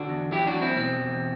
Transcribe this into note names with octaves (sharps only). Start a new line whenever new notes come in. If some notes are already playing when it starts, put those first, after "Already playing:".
Already playing: D3 D4 F#4
E2
F#3 E4 G4
D4 F#4
E2
C4 E4
B2 C4
E2